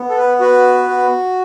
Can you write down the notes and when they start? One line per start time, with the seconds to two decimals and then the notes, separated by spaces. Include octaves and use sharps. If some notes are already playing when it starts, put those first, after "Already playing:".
Already playing: B3
0.09 A4
0.17 B4
0.40 F#4 B4
0.88 F#4